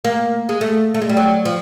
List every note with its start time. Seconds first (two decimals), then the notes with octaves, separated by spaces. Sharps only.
0.05 A#3
0.49 G#3
0.61 A3
0.94 A3
1.02 G#3
1.09 G3
1.17 F#3
1.45 F3